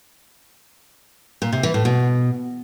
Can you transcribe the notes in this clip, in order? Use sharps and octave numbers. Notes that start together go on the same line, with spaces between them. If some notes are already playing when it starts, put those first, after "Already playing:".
A#2
C3
E3
A2
B2